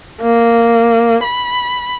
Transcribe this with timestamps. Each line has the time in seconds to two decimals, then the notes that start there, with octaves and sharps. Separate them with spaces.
0.22 A#3
1.24 B5